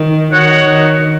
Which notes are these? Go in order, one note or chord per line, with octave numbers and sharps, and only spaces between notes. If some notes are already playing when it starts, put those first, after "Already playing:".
Already playing: D#3
D#3 D#4 F#4 C#5 F#5
D#3